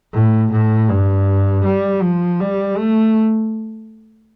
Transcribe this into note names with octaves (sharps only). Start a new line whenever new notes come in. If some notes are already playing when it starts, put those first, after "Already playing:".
A2
A2
G2
G3
F3
G3
A3